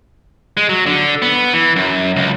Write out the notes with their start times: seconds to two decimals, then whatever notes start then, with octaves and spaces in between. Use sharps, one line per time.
0.57 G#3
0.69 F#3
0.86 D3
1.22 B3
1.53 E3
1.76 F#2
2.16 C#2